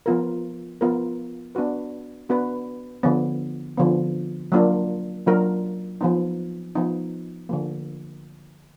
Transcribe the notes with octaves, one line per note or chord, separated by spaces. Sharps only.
F3 B3 F4 A#4
F3 B3 F4 A#4
B3 D4 F#4 B4
B3 D4 F#4 B4
D3 F3 B3
D3 F3 B3
F#3 A#3 D4 F4 A#4
F#3 A#3 D4 F4 A#4
F3 B3 D#4
F3 B3 D#4
D3 F3 A#3